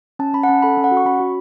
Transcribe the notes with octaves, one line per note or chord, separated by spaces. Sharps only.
C#4 A5
C#4 B5
F#5
C#4 A5
A4 B5
C#4
F#5
F#4
C#6
C#4 B5
F#4